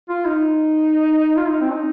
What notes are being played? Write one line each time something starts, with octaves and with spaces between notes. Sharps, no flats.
F4
D#4
F4
D#4
C4
D#4